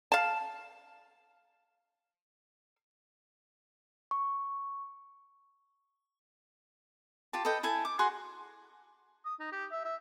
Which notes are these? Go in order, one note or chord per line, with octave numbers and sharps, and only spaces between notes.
F5 A5
C#6
F4 G4 A5
A4 B4 D#5 G5
E4 A4 G#5 A5
D6
F#4 G#4 F#5 C6
D#6
D#4
G4
E5
E5